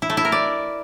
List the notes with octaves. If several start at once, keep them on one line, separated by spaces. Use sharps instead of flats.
E4
A3
E4
A#4
D5